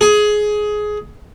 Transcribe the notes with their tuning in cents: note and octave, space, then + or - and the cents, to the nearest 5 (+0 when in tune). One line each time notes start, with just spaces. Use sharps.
G#4 +15